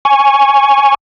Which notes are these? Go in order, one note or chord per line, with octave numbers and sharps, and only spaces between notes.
G#5 C#6